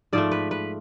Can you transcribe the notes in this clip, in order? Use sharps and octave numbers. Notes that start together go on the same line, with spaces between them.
G#2 F3 A3 D5
B4
B4